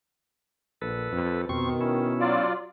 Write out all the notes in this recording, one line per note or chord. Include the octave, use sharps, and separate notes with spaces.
A#1 A4 B4
F2
F2 B2 D#3 C4 C#6
C#4 E4
F#3 F4 D5